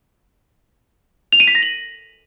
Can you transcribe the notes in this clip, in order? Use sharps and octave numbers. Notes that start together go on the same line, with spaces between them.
F7
D#7
B6
A#6
F#7